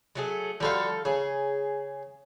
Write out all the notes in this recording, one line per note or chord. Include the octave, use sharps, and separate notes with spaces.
F#3 A3 G#4
D3 F3 G3 F#4 A4 F5
C#3 G#4